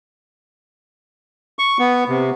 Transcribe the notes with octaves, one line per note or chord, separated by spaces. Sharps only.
C#6
B3
C3